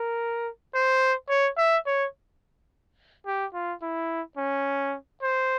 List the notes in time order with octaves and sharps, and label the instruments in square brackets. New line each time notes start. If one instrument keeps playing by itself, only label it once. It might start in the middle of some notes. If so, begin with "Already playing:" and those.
Already playing: [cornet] A#4
C5
C#5
E5
C#5
G4
F4
E4
C#4
C5